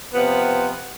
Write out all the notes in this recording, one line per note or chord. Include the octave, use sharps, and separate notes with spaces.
C3 F3 B3 B4